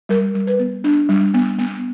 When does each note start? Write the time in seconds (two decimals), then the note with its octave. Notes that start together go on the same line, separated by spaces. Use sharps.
0.09 G3 A#4
0.35 G3
0.47 B4
0.59 B3
0.84 D4
1.09 G3
1.34 B3
1.59 B3